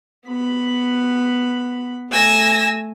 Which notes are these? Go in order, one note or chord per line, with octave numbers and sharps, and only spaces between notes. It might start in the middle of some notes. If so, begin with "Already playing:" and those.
B3 B5
A3 G#5 E6 A#6